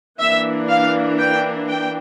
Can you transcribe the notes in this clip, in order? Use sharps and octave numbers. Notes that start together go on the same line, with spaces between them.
E3 A#3 D4 E5
F5
G5
G5